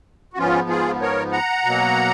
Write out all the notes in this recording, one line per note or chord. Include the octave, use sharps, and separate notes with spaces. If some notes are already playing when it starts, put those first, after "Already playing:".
F#4
G#2 F3 B3 C#4 F4
F4 G#4
A#4 C#5
F#5 A#5
B2 F#3 A#3